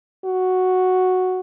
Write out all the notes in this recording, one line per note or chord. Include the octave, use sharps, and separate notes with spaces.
F#4